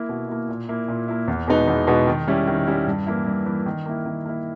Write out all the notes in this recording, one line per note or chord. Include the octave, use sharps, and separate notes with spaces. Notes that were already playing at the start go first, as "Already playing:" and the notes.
Already playing: A#3 E4
B2
A#3 E4
A#2
A#3 E4
A#2
A#3 E4
E2
B2 G#3 B3 D#4
E2
B2 G#3 B3 D#4
D#3
G3 C#4 E4
D#3
G3 C#4 E4
G2
E3 A#3 E4
G2
E3 A#3 E4
D#3
A#3 E4
D#3
A#3 E4